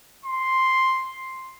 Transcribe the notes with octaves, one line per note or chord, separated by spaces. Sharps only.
C6